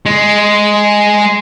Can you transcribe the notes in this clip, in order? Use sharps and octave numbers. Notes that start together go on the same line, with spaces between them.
G#3